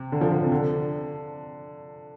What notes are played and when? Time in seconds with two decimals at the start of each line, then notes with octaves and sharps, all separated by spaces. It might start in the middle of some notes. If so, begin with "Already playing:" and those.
Already playing: C3
0.12 D3
0.21 F3
0.31 D3
0.42 C3
0.52 D3